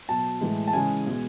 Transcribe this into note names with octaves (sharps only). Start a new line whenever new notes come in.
B2 F#3 A5
A2 E3 G#3
A5
C#3 E3 G#3 G#5
B2 G#3